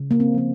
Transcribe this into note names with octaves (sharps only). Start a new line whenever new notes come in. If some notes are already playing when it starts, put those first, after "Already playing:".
Already playing: C#3
A#3
C4
F3 A#3